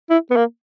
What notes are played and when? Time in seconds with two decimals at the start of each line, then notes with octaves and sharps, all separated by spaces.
0.10 E4
0.31 B3
0.36 A#3